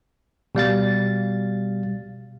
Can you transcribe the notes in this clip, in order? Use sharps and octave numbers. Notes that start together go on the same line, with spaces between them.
B2 G3 F5 A6